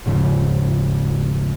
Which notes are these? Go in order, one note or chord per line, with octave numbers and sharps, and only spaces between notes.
D#1 G#2 C#3 F3